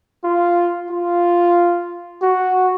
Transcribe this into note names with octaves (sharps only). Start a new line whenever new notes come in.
F4
F4
F#4